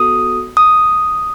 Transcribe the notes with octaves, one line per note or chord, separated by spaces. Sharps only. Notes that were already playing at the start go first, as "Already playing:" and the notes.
Already playing: B3 F#4 A4 D#6
D#6